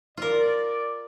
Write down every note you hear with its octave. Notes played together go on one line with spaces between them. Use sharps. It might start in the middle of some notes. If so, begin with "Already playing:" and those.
F4 A#4 D5